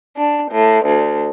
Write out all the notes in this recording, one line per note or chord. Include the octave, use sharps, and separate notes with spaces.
D4
A2
D2